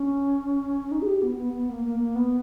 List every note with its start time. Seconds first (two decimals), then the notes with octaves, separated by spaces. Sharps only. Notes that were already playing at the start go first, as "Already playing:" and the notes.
Already playing: C#4
0.91 D#4
1.02 G#4
1.07 G4
1.22 B3
1.38 B3
1.53 B3
1.69 A#3
1.85 A#3
2.00 A#3
2.15 B3